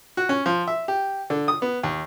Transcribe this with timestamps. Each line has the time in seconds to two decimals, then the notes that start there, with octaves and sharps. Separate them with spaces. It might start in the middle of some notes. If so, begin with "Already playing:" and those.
0.17 F#4
0.29 C#4
0.46 F3
0.68 E5
0.88 G4
1.30 D3
1.48 D#6
1.62 B3
1.83 D#2